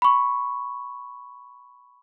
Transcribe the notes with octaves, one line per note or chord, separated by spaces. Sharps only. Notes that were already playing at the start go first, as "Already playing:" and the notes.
B5 C#6